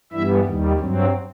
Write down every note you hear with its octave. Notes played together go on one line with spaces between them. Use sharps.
G2 E3 G3 B3 E4 E5
D#2 D#3 G3
G2 F#3 C4